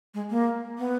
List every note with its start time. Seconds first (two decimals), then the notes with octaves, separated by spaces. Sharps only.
0.14 G#3
0.30 A#3
0.78 B3